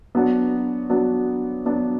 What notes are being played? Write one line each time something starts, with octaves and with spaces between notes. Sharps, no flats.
F#3 B3 D4 F#4
F#3 B3 D4 F#4
F#3 B3 D4 F#4